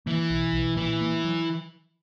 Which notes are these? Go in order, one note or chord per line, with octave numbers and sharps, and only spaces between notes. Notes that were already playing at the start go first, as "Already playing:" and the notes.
E3 A#3
B1
B1
A#2 E3
A#3
F#3